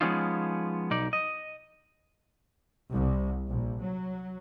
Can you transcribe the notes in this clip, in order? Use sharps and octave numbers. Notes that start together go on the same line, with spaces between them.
F3 G#3 B3 C#4 D#4 F4
B1 D#4 D5
D#5
C2
A#1
F#3